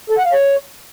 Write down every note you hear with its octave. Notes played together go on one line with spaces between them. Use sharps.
A4
F#5
F5
C#5